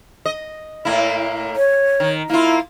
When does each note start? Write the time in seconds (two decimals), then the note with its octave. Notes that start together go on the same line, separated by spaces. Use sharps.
0.26 D#5
0.85 A2 A#3 E4
1.56 C#5
2.00 D#3
2.30 A#3 E4 F4